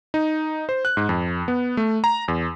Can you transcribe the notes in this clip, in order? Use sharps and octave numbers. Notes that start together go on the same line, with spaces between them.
D#4
C5
F#6
G#2
F2
B3
A3
A#5
E2